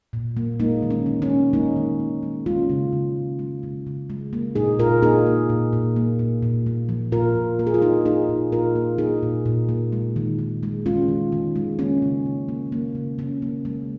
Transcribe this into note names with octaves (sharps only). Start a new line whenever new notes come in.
A#2
A#3
G#3 A#3 D#4
D#3
C#4
D#3
C#4
G#3
G#3 A#3 D#4
D#3
D#3
G#3
G#3 C#4 F4
C#3
C#3
G#3
G#3
C#3
C#3
G#3
A#3
A#2 D#4 G#4
A#2 F4 A#4
A#3 D#4 G#4
A#3
A#2
A#2
A#3
A#2
A#2
A#3
F3
A#2 F4 A#4
A#2
A#3 A#4
G#4
F4
F3 D#4 G#4
A#3 D#4 G#4
A#2
A#2 F4 A#4
A#3
A#3 D#4 G#4
A#2
A#2
A#3
G#3
D#3
D#3
G#3
G#3 C#4 F4
D#3
D#3
G#3
A#3 C#4
C#3
C#3
A#3
A#3
C#3
C#3 C#4
A#3
G#3 A#3